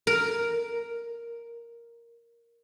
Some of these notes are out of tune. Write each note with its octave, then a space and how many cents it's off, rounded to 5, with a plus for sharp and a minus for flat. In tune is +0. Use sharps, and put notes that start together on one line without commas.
A#4 +0